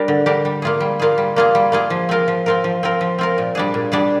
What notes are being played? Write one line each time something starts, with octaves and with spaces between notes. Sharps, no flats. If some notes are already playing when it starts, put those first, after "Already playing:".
Already playing: G3 D4 G4 A#4
D3
G3 D4 G4 A#4
G3
A#3 F4 G#4
G3
A#3 F4 G#4
G3
A#3 F4 G#4
G3
A#3 F4 G#4
F3
C4 F4 A#4
F3
C4 F4 A#4
F3
C4 F4 A#4
F3
C4 F4 A#4
A#2
G3 D4 G#4
A#2
G3 D4 G#4